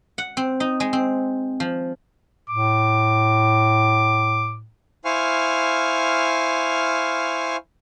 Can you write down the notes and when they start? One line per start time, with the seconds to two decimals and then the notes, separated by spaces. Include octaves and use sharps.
0.18 F#5
0.37 C4
0.60 D#4
0.80 G#3
0.93 C4
1.60 F3
2.50 A2 D6
5.05 E4 C5 F5 G#5 C#6 F6